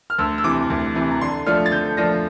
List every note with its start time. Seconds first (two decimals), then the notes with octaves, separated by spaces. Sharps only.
0.10 F6
0.18 D2 E6
0.38 E6
0.44 C3 E3 D6
0.70 D2
0.95 C3 E3
1.11 A#5
1.21 D3 C6
1.46 F3 A3 D4 F4 F6
1.66 A6
1.71 D3 G6
1.97 F3 A3 D4 F4 A#6